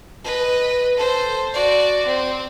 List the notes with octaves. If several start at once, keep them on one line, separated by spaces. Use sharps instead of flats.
B4 D#5
A4 C5
F#4 D5
C4